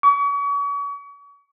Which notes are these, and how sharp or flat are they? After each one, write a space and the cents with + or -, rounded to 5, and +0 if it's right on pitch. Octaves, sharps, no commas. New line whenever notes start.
C#6 +40